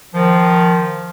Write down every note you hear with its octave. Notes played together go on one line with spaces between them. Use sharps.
D#3 F3